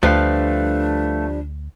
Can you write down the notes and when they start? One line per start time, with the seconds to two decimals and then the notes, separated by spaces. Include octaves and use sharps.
0.03 D2 F3 G3 A3 D4 B4 F5